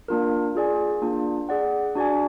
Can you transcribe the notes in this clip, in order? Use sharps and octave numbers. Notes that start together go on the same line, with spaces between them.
A#3 D4 F4 A#4
F4 G#4 D5 G#5
A#3 D4 F4
G#4 D5 F#5
D4 F#4 D5 G#5